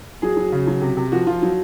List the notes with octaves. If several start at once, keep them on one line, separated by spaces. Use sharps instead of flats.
F#3 G#4
F#3
C#3
F#3
C3
C3
F3 F#4
F3 F4
F#3